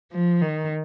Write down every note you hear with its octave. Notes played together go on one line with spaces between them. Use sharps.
F3
D#3